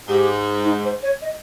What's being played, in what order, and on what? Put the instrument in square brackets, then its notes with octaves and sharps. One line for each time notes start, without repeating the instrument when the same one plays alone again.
[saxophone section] G#2 [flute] G4
[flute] D#4
C5
C#5
D#5